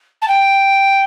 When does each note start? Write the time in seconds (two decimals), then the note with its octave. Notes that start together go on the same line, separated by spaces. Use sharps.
0.22 A5
0.28 G5